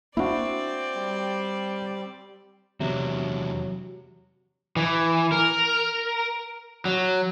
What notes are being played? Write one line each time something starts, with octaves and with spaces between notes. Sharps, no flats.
A#3 C4 D4 E4 F#4 D5
G3
E2 C3 F#3 D4
E3
A#4
F#3